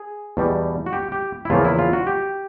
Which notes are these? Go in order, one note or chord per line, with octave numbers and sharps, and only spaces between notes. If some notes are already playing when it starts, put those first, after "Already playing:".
Already playing: G#4
E2 B2 G3
F#4
G4
G4
E4
E2 C#3 F3 A#3 C#4 F4
E4
F4
F#4
G4